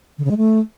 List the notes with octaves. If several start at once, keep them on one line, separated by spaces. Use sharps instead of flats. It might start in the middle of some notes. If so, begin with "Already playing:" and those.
D3
C#3
G#3
A3